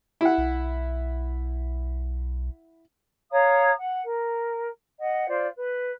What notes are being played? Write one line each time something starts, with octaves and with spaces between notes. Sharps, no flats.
E4 F#5
B1
C#5 F5 A#5 D#6
F#5
A#4
D#5 F#5
F4 C5 D5
B4